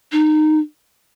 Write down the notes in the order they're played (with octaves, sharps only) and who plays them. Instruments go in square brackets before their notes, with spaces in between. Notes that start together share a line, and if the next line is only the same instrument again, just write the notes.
[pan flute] D#4